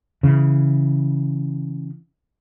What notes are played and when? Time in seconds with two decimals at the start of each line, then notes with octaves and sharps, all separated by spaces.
0.23 C#3 E3